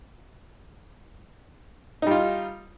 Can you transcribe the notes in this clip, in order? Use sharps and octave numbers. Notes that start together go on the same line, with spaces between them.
G3 D#4 F4